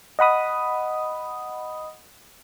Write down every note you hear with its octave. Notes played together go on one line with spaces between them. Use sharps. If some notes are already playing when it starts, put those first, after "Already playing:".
D#5 F#5 B5 D#6